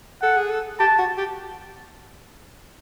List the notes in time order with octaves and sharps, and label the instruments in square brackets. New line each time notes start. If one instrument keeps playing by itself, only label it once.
[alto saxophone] A4 [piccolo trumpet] F#5
[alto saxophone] G#4
A4
[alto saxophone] G4 [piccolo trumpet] A5
[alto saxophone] F#4
G4